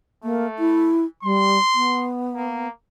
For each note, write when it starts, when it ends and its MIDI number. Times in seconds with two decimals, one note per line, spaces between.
0.24 0.94 57
0.24 0.46 58
0.59 1.05 64
1.23 1.58 55
1.23 2.10 84
1.75 2.68 59
2.35 2.69 58